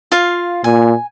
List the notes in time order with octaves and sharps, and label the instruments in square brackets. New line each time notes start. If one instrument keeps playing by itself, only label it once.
[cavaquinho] F4 F5
[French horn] A#2 [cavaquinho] G#5